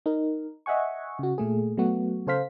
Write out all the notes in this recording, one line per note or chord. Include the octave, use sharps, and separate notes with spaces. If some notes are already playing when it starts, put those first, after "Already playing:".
D#4 A#4
D#5 E5 F#5 G#5 C#6
C#3 F#4
A#2 A3 G#4
F#3 A3 B3 F#4
C#3 A4 C5 F5 B6